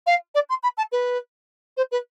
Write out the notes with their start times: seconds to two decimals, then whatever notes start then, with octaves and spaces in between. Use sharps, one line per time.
0.06 F5
0.35 D5
0.49 C6
0.63 B5
0.77 A5
0.92 B4
1.77 C5
1.91 B4